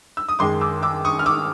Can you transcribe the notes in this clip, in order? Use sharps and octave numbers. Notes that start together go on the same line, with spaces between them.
E6
D#6
F#2 D#3 G#3 C6 D6
D6 E6
D6 E6
C#6 D#6
F6
D6 E6